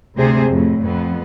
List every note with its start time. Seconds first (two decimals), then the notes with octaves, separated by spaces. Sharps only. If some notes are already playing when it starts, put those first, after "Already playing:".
0.15 D2 C3 G#4 C5
0.48 F2 A2
0.78 F2 B3